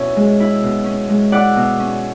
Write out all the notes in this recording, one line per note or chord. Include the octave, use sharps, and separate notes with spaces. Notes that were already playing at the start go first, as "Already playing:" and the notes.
Already playing: B2 C#4 E4 C#5 E5
G#3
E4
B2
C#4
G#3
E4 D5 F#5
B2
C#4